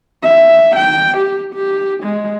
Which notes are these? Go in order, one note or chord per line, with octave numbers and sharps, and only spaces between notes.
E5
G5
G4
G4
G#3